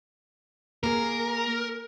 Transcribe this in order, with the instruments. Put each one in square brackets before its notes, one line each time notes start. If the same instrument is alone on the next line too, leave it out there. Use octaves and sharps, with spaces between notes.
[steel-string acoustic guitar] A#3 G#4 [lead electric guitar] A#4